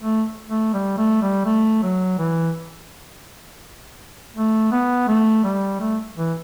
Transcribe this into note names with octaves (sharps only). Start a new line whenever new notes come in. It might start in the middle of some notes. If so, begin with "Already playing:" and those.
A3
A3
G3
A3
G3
A3
F#3
E3
A3
B3
A3
G3
A3
E3